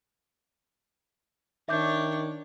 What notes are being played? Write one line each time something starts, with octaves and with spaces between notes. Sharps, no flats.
D#3 D4 C#5 E5 D6 G6